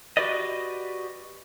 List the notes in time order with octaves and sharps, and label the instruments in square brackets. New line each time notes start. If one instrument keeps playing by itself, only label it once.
[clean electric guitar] F#4 G4 B4 D5 D#5